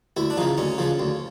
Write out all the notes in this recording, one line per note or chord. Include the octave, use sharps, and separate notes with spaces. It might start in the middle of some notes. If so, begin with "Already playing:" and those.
D2 E4
D4
C#3 F3 D#4
D2 C#4
C#3 F3
D2